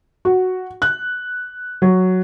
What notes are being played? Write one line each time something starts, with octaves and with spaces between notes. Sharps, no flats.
F#4
F#6
F#3